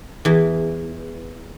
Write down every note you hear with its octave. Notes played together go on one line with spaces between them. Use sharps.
E2 E3